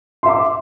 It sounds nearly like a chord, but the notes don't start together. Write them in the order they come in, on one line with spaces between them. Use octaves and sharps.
C6 E5 D6